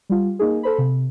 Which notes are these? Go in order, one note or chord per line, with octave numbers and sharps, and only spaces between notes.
G3 F4
A#3 D#4 G#4
A4 C5 B5
C3